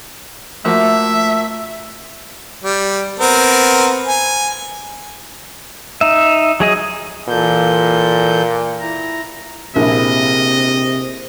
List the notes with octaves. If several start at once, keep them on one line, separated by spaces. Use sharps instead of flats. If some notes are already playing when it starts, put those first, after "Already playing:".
F3 A3 A#3 F#4 E5
G3
B3 C4 A#4
G#5
D#4 E5
F#3 G#4 D#5
A#2 E3 A4 G6
E4 A#5
A#1 C3 A#3 E4 G#4 D#5